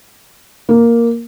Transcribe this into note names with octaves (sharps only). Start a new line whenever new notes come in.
A#3